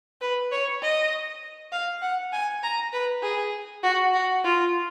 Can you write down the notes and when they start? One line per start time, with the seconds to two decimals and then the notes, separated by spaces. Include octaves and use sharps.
0.21 B4
0.51 C#5
0.82 D#5
1.72 F5
2.02 F#5
2.33 G#5
2.63 A#5
2.93 B4
3.23 G#4
3.83 F#4
4.13 F#4
4.44 F4